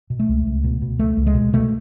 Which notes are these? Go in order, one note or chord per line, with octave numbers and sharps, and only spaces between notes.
B2
A3
C#2
C#2
B2
B2
C#2 A3
C#2
G#3
B2
B2 A3